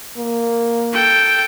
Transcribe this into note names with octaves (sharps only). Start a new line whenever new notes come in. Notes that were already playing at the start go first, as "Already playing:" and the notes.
A#3
A4 G5